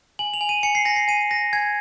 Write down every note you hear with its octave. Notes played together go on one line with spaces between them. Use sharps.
G#5 F#7
F7
G#5
D#7
G#5 C#7
C7
G#5 A#6
C7
G#5 D#7
G#5 A#6
G#5 G#6